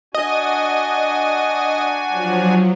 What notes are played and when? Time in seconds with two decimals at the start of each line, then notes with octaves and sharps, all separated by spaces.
0.14 D4 F#4 D#5 G#5
2.10 F3 F#3